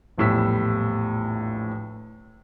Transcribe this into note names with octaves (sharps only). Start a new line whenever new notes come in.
A#1 E2 A2 G3 E6 B6